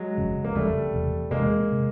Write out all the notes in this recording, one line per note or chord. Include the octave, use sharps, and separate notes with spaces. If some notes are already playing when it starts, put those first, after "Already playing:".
Already playing: F#3 G#3
F#1 F2 C#3
A#3
F#1 F2 C#3 G3 A3
E1 E2 C3
E1 E2 C3 G#3 A#3
C3